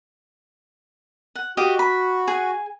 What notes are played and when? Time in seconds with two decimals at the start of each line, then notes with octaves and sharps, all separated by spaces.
1.35 F#5
1.57 F#4 G4 D#5 F5
1.79 B5
2.28 G#4 G#5